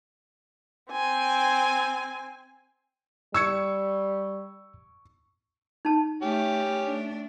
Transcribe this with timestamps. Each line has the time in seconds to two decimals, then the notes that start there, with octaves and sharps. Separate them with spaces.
0.90 C4 G#5
3.34 G3 C#6 E6 G#6 C#7
5.85 D#4 A5
6.22 A3 C#4 G4
6.84 A3 D4